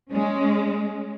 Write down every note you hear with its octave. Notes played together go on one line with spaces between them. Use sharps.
G#3 C#4